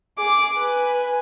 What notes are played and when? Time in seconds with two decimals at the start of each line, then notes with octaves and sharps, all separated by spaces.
0.18 G#4 D6
0.58 B4 G#5